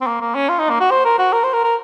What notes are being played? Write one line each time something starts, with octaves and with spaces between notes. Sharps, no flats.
C4
A#3
A#3
C#4
F4
D#4
A#3
F#4
C5
A#4
F#4
A#4
C5
A#4
A#4